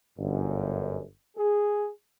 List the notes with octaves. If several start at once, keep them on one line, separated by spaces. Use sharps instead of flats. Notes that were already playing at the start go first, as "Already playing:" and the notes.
G1 F#2
G#4